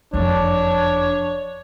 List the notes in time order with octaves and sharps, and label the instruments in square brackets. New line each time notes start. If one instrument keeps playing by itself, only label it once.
[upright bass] F#1 F2 [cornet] D4 [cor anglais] C#5